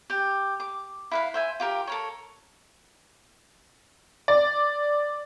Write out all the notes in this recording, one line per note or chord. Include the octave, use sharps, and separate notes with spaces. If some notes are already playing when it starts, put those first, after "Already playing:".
G4 G5
D6
E4 B4 F5
C5 E5 G#5
F4 G4 A#4
A4 A#4 C#5
D5